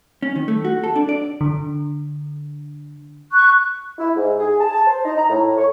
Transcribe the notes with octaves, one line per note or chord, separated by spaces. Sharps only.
C#4
D#3
A3
F#4
A4
D4
D5
D3
C#6 F#6
E4
G#2
G#4
A5
A5
C5
D#4
A#5
A2
C#5